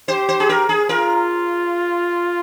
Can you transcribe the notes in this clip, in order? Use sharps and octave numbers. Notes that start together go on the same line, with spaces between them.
G4 C5
C5
G#4
A#4
G#4
F4 A#4